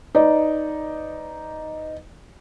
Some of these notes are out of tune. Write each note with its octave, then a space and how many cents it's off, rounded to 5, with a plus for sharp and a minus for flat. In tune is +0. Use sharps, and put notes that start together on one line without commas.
D#4 +0 B4 +30 D5 +0